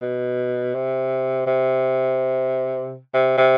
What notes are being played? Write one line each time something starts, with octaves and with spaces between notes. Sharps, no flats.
B2
C3
C3
C3
C3